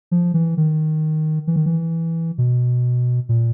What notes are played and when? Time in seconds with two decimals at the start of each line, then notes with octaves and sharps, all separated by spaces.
0.11 F3
0.34 E3
0.57 D#3
1.47 E3
1.56 D#3
1.66 E3
2.38 B2
3.29 A#2